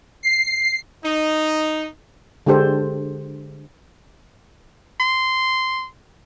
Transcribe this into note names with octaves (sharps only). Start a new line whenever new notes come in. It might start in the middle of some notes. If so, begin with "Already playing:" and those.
C7
D#4
D3 G#3 D4 G4 A4 C5
C6